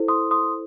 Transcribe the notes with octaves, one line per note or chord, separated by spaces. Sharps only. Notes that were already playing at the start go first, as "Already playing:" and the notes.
Already playing: E4 A4 C5
C6 D#6
C6 D#6